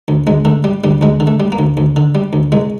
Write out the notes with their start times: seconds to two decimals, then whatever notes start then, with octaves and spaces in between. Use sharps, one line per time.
0.08 D2
0.27 D2 G#3
0.45 D3 A3
0.64 G3
0.84 D2 G3
1.01 D2 G#3
1.20 D3
1.27 A3
1.40 G3
1.52 A#3
1.59 D2
1.77 D2
1.96 D3
2.15 G3
2.33 D2
2.52 C2 G#3